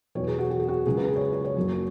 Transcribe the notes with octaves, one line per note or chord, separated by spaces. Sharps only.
E2 B2 F#3 C#5
G#4
F#4
F#4
G#4
F#4
C#2 C#3 F#3 G#4
B4
G#4
C#5
B4
C#5
C#5
F#1 F#2 F#3